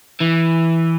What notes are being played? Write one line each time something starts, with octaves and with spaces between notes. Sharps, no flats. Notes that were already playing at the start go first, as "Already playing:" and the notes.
E3